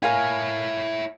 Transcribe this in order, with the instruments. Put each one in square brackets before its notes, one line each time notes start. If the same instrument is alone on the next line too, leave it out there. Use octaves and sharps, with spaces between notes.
[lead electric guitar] E4 C#5 [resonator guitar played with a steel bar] A#4 F5 G#5